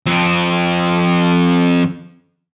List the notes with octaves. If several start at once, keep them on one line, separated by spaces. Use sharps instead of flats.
F2 C4